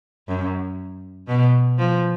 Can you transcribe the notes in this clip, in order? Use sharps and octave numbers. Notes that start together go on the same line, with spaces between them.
F#2
B2
F3